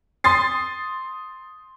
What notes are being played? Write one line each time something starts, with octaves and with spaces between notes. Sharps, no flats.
C6 D#6 A6 C7